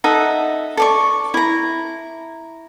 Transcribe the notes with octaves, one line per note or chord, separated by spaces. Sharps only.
D#4 A4 E5 F#5
A4 D5 C#6
E4 A#5